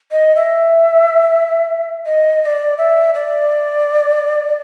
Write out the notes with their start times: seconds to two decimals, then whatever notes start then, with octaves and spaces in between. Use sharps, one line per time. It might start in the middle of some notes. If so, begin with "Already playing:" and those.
0.11 D#5
0.36 E5
2.05 D#5
2.41 D#5
2.45 D5
2.78 E5
3.14 D5